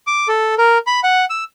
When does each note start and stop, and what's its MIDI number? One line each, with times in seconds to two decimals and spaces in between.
0.07 0.28 86
0.28 0.55 69
0.58 0.78 70
0.87 1.00 83
1.04 1.25 78
1.30 1.44 88